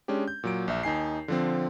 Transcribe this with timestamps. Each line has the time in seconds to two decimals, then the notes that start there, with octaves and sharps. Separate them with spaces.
0.08 G#3 C#4 D4 G4
0.28 G6
0.44 A#2 F#3 D7
0.68 A#1 E5
0.83 D#2 D#4 G#5 C7
1.28 D3 F3 C4